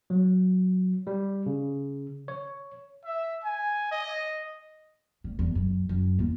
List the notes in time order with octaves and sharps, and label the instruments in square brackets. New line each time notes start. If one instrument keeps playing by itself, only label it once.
[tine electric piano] F#3
G3
C#3
C#5
[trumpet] E5
G#5
D#5
[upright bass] D2
E2
F#2
F#2
E2 A#3